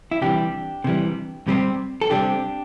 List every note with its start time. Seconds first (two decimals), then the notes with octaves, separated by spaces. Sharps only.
0.11 E4
0.21 C3 E3 G3 D4 G4
0.84 C3 E3 G3
1.48 C3 G3 C4
2.01 A4
2.10 C3 G3 C4 D4 G4